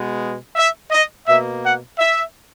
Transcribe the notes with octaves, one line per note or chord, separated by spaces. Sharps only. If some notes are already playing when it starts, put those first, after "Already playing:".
Already playing: B2 G#3 B3
E5
D#5
B2 A#3 E5
F#5
E5